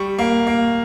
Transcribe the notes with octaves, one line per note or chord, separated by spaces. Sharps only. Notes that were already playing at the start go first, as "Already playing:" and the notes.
Already playing: G3 C#6
A#3
A#3